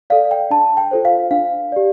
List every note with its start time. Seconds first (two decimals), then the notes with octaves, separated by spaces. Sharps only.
0.10 A4 D5 F5
0.31 G5
0.50 D4 A5
0.77 G5
0.91 F4 A4 C5
1.05 F5
1.31 D4 F5
1.72 G4 D5